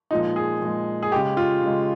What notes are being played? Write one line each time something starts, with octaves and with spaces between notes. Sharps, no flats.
A#2 F3 G#3 D#4
G#4
A#2 F3 G#3
G#4
C#3 G#3 G4
F4
C#3 G#3